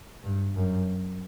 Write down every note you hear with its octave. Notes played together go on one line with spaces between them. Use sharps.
G2
F#2